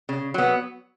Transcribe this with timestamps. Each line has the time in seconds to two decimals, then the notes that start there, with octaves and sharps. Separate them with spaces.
0.09 C#3
0.34 F#3 B3